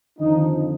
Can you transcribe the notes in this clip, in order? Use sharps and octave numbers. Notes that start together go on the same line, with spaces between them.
F2 D3 D#3 F3 D#4